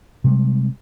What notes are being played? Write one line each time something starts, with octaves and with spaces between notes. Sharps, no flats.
C3 G3 G#3